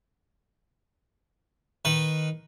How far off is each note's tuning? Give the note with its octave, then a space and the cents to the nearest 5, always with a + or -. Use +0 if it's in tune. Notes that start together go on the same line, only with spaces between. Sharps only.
D#3 +0 B4 +0